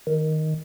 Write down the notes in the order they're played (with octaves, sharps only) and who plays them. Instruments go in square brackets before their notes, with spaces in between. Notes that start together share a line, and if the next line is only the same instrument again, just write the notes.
[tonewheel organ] D#3